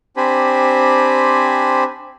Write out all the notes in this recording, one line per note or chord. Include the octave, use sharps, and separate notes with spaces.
C4 D4 G4 C5 G#5 B5